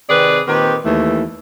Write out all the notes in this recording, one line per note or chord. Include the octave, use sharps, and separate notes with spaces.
C3 D#3 C4 G#4 B4 D5
A#2 D#3 C4 G4 B4
D#2 E3 A3